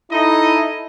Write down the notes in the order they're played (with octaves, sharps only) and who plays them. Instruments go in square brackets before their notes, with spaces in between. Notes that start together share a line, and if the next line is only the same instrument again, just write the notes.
[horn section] D#4 A4 D#5 [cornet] E4